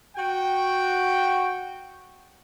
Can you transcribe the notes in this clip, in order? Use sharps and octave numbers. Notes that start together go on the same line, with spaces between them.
F#4 G5